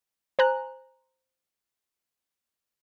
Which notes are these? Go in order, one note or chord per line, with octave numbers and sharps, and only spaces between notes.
C5 G#5 A#5 F#6